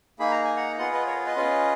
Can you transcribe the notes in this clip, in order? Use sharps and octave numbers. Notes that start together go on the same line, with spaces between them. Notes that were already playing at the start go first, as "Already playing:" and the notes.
A#3 D#4 G#4 B5
A#5
G#5
F#5 A#5
B3 F4 G#4 D#5 F#5
B4 D#5
A#4 C#5
B4 D#5
C#4 F4 G#4